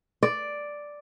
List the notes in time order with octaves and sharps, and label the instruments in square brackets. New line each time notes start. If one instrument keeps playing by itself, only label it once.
[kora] D5